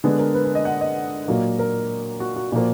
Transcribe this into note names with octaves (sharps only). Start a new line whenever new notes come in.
D3 G#3 B3 G#4
A#4
B4
B4
D#5
F#5
D#5
A#2 F#3 A#3
A#4
F#4
F#4
A#2 F3 A#3 F#4